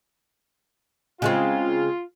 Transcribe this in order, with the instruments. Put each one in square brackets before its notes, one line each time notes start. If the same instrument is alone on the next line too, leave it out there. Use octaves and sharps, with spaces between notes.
[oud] C#3 G#3 C4 [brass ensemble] F4